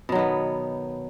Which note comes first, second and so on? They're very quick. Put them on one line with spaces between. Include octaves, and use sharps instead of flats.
B2 F#3 D#3 B3